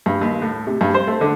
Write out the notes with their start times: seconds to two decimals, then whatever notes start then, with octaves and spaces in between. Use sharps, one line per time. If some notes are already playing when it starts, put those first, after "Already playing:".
0.06 G2
0.21 D#2
0.42 A2
0.67 C3
0.81 G2
0.94 C5
1.07 A3
1.21 D3